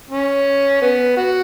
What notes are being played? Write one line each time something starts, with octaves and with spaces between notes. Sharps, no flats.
C#4
B3
F#4